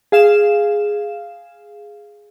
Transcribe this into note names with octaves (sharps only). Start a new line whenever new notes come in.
G#4 F5 E7